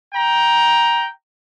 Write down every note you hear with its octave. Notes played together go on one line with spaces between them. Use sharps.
G5 A#5